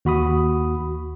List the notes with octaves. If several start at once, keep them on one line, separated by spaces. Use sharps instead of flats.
D#2 F#4 B5 D#6